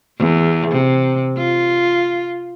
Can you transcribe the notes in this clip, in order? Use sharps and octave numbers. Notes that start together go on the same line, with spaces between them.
E2
C3
F4